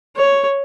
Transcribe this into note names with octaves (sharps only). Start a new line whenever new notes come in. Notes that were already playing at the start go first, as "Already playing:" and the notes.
C#5